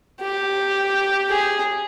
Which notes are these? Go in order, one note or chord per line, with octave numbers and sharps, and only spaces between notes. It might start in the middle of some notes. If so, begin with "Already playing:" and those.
G4
G#4